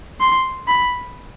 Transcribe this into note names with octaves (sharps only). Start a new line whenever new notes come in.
C6
B5